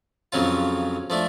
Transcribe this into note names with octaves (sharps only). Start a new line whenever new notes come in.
F2 C#3 F#3 C#4 F4
F3 A3 D4